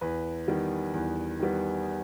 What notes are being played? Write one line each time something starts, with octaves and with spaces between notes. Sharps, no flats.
E2 B4
D#3 G3 B3
E2
D#3 G3 B3